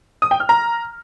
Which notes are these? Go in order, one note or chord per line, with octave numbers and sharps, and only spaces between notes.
D#6
G5
F6
A#5